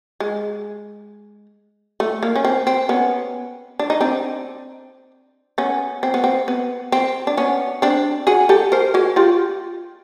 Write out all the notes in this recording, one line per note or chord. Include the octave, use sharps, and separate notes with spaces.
G#3
A3
A#3
C#4
C4
C4
B3 C#4
D4
D#4
C4 D4
B3 C#4
C4
B3
C4
B3
C4
D4
B3 C#4
C4 D4
F#4 G#4
G4 A4
A#4 C5
F#4 G#4
F4 G4